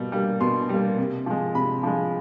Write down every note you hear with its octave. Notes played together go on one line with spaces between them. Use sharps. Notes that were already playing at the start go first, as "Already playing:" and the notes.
Already playing: B2 G3 A#3
G3 A#3
B2 C6
G3 A#3
C3
F3 G#3
C3 B5
F3 G#3